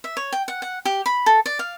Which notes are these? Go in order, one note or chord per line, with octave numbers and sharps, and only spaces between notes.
E5
C#5
G5
F#5
F#5
G4
B5
A4
D5
F5